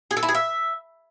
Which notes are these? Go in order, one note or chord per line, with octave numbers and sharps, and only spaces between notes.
G#4
A4
E4
G#4
E5